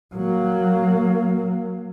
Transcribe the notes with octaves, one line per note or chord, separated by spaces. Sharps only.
F#3 A#3